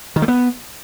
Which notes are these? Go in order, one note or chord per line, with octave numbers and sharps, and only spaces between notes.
D#3
A3
B3